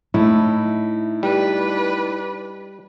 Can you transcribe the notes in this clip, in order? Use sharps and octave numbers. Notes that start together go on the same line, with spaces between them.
A2 D#4 E4
G3 D4 B4